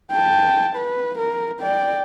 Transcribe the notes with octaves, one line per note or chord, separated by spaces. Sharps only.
G5 A5
B4
A#4
D5 G5